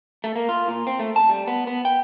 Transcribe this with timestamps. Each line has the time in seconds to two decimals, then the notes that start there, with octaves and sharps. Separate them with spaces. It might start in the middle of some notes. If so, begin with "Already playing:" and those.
0.24 A3
0.36 A#3
0.49 F4
0.68 A#2
0.87 C4
0.99 A3
1.16 A5
1.29 G3
1.48 B3
1.67 B3
1.85 G5